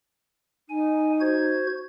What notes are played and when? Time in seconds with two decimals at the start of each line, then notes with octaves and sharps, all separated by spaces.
0.69 D#4 G#5
1.21 F#4 C5 G#6